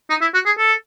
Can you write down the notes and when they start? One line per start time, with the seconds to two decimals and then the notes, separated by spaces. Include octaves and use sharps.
0.10 D#4
0.21 E4
0.34 F#4
0.46 G#4
0.58 A4